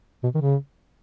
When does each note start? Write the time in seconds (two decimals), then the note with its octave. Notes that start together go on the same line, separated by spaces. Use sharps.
0.23 B2
0.34 D#3
0.41 C#3